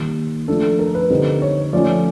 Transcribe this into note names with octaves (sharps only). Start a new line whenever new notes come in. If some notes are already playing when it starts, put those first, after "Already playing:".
Already playing: D#3 G3 A#3
F3 A3 D4 A4
A#4
B4
D3 G3 C4 D#4
C#5
F3 A3 C#4 D5